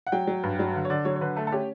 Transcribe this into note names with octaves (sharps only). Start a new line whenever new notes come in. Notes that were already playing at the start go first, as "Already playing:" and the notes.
F#5
F#3 G5
F#3
G2
F#3
D3
C#5
D3 D5
F#3 C#5
C#5
D3 B4
A3 A4
A4
C#4 G4